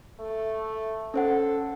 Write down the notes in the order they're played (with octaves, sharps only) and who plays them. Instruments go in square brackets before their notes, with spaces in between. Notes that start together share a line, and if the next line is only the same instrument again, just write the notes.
[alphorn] A3
[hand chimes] C#4 C5 F#5 [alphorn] A4